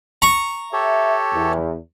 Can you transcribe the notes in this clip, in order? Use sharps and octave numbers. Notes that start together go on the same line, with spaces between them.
A#5 C#6
G4 A4 C#5 E5
E2